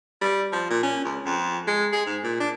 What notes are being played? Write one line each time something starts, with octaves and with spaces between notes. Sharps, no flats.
G3
F3
A#2
C#4
C#2
F2
G#3
G#4
G#2
A#2
D4